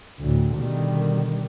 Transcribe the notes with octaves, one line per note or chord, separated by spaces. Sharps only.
D2 A2
B2 D3 D#3 G3